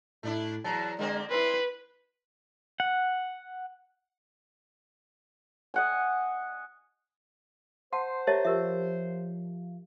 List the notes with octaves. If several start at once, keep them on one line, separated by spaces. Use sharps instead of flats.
A2 A3 D4 E4
E2 F#3 A5
D3 G#3 A#3 C4
C4 E4 B4 C6
F#5
D#5 F#5 G#5
C5 F#5 A5 C6
G4 A#4 C#5 E5 A5 A6
F3 G4 A#4 E5